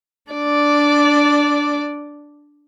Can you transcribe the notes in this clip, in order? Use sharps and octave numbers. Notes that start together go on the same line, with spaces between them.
D4 D5